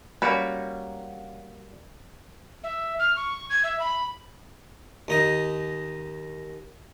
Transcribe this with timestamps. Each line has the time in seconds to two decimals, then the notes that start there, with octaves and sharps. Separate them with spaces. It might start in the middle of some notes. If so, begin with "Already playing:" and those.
0.22 G3 A#3 C#4 F#4 B4
2.64 E5
2.99 F6
3.16 C#6
3.50 G#6
3.64 E5
3.80 B5
5.08 D#2 D#4 D#5